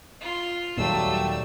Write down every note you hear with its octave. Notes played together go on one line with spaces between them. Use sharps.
F4
D#2 A#2 F#3 G3 A3 E6